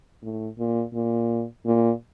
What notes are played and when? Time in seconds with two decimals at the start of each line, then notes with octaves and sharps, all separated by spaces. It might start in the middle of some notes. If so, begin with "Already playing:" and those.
0.23 A2
0.59 A#2
0.94 A#2
1.66 A#2